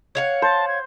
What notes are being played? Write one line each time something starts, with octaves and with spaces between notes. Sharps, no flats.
C#5 F5 F#5
C5 A5
G#6